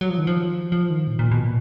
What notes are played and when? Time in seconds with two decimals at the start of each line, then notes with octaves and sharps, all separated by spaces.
0.01 F#3
0.10 F3
0.18 D#3
0.27 F3
0.72 F3
0.90 D#3
1.07 A#2
1.19 A#2
1.31 B2
1.43 A#2